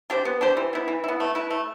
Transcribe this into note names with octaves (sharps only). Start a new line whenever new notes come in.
D4 G4 C5
B3
D4 G4 C5
E3
B3 E4
E3
B3 E4
A3
E4 B4
A3